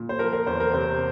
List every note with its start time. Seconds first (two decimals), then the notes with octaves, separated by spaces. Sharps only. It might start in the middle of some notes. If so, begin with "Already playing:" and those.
Already playing: A#2
0.09 C5
0.19 F3 A#4
0.33 A#4
0.47 E2 C5
0.60 A#4
0.73 C3 C5